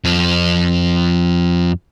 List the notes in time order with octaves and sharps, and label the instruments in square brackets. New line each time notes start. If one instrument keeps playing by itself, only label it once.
[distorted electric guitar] F2 C4